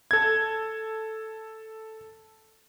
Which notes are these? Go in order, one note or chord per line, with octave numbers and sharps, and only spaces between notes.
A4 G#6